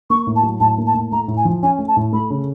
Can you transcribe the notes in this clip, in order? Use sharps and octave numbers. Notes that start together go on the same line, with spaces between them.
A#3 C#6
A2
A5
F#3
A2 A5
A#3
A5
A2
A3 A#5
A2
G#5
F3
C#4 G#5
A3
A5
A2
A3 B5
C#3